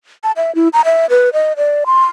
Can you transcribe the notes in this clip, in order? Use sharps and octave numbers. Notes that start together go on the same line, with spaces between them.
A5
E5
E4
A#5
E5
B4
D#5
D5
C6